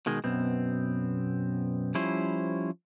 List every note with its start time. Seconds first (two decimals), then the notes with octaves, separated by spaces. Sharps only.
0.06 B2 D#3 G#3
0.24 F#2 B2 B3 C4
1.95 F3 G3 C#4 E4 C5